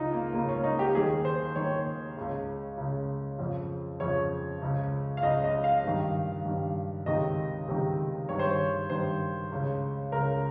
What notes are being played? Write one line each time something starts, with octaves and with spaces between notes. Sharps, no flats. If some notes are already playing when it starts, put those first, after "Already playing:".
Already playing: C#2 C#3 D#4 F4
A#3
C#2 C#3 A#3
C#4
D#4
G4
D#2 D#3 G#4
C5
D#2 D#3 C#5
C#2 C#3
C#2 C#3
F2 C#3
F2 C#3 C#5
C#2 C#3
F5
C#2 C#3 D#5
D#5
F5
G2 D#3
G2 D#3
C#2 C3 D#3 D#5
C#2 C3 D#3
G2 D#3 C#5
C5
C#5
G2 D#3 C5
C#2 C#3
C#2 C#3 A#4